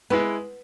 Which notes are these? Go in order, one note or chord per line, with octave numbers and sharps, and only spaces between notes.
G#3 B3 E4 B4